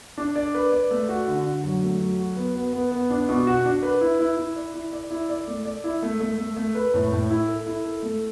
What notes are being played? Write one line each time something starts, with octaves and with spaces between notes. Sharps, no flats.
D4
D5
B4
D5
A3
F#4
D3
D3
F#3
A3
F#3
F#4
B3
B3
B3
B3
D4
B2
F#4
D4
B4
E4
E4
E4
D5
E4
D5
E4
D5
A3
D5
E4
A3
A3
A3
A3
B4
A2
A2
E4
A4
E4
A4
A3